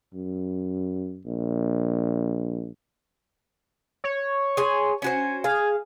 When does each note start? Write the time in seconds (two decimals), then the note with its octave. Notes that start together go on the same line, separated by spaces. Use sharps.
0.14 F#2
1.26 A#1
4.04 C#5
4.57 G#4 G#5 C6
5.02 C#4 F#4 C5 G#5
5.44 G#4 F5 G#5